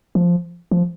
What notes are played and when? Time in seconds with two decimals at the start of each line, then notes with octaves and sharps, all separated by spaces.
0.15 F3
0.71 F3